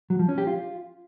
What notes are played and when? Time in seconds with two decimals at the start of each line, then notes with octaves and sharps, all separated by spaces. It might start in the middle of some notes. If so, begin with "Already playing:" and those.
0.10 F#3
0.19 F3
0.29 C#4
0.38 G4
0.47 F4